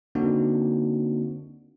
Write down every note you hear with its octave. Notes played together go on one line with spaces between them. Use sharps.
D3 A#3 C4 D4 D#4 F#4